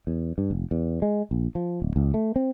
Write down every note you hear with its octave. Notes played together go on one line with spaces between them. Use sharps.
E2
G2
F1
E2
G#3
A#1
F3
D1
C#2
A3
C4